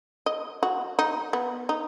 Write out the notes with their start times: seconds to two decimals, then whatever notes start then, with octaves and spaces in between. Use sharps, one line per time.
0.26 D#5
0.63 F#4
0.99 D#4
1.33 B3
1.69 D#4